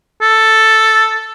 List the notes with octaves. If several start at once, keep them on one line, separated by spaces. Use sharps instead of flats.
A4